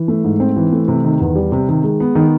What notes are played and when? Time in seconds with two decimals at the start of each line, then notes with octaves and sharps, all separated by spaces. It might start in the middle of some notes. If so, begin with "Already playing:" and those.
Already playing: E3
0.08 A3
0.24 G#2
0.40 C4
0.56 E3
0.72 A3
0.88 C3
1.05 D#3
1.20 E2
1.36 G3
1.52 C3
1.68 D#3
1.83 G#3
2.00 B3
2.15 D#3